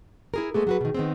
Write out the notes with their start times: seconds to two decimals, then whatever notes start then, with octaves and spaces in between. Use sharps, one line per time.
0.34 E4 G#4 A#4
0.54 G#3 A3 B3 G#4
0.67 F#3 F#4 B4
0.81 B2 D#3
0.95 D#3 B3 C4